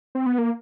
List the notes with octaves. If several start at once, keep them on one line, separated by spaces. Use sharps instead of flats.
C4
B3
A#3